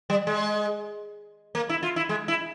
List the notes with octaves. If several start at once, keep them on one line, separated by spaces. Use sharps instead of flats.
G3
G#3
A#3
E4
F4
E4
G#3
E4